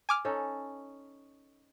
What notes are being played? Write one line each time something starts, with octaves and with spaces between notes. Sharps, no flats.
G#5 D6 F6
C#4 D#4 A4